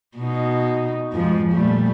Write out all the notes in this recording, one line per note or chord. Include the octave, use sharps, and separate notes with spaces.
B2 D#4
F2 G#2 F3
A#2 G3 A3